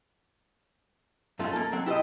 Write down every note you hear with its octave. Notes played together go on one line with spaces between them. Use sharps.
F#2 A3 C#4 F4
A#3 A4
F#3 C4 F#5
E4 G4 A4 C5 D#5